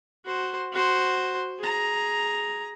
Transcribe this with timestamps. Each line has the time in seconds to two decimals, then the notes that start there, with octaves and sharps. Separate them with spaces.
0.25 F#4 C5
0.73 F#4 C5
1.59 G#4 A#5